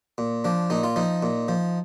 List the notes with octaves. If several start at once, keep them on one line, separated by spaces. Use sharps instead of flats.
A#2
F3 D4
A#2 D#4
F4
F3 D#4
A#2
F3